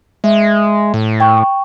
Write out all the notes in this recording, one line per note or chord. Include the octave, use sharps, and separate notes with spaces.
G#3 E5
A2
G5 C#6